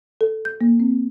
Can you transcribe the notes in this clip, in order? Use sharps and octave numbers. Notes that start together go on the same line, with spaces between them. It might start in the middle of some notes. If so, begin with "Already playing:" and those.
A4
G6
A#3
C4